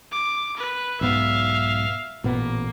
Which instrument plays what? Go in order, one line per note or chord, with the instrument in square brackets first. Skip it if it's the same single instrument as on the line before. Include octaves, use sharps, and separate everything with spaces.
[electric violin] D6
B4
[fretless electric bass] B1 G#2 B3 [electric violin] E5 F5
[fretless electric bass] A1 A#2 B3 [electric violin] A#3